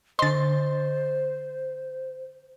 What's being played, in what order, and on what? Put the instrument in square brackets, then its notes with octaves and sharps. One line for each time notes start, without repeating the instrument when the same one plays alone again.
[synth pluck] D3 D#5 [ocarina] C5 [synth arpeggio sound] C6 A6